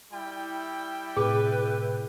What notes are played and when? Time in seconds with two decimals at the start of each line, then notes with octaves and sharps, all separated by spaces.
0.12 G3 E4 G5
1.17 A2 C3 G#4 B4